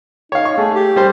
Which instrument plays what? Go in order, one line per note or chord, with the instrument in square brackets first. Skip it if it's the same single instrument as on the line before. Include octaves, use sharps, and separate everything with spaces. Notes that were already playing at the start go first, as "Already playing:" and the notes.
[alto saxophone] D#4 [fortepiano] C#5 F5
[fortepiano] C#6
[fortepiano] A3 [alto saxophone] G#4
[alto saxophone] G4
[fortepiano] G3 C5